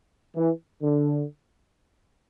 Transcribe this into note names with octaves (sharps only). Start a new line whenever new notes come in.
E3
D3